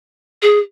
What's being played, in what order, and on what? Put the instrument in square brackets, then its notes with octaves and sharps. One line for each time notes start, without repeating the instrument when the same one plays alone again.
[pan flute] G#4